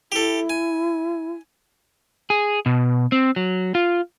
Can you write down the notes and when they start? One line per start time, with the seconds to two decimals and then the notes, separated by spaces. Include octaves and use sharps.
0.12 E4 G4 A4
0.50 G#5
2.30 G#4
2.66 B2
3.12 C4
3.36 F#3
3.75 F4